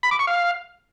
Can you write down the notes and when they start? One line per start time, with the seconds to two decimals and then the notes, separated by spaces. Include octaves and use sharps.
0.03 B5
0.11 D6
0.19 C#6
0.27 F5